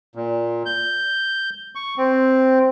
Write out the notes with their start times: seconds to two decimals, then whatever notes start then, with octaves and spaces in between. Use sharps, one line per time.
0.15 A#2
0.66 G6
1.75 C#6
1.98 C4